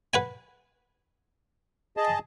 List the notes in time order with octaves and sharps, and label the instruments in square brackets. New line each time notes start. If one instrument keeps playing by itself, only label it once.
[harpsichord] B4 F#5 G#5
[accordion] G#4 D#5 A5